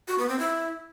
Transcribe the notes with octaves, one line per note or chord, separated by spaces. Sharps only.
F#4
B3
C4
E4